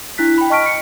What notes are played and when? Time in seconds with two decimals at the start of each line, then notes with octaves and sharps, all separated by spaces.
0.18 D4 E4 F#6 B6
0.38 G5 B5
0.50 D#5 A5 C#6 F6 B6 D7
0.66 C#7